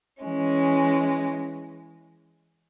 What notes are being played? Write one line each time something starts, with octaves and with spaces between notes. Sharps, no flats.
E3 G#3 C#4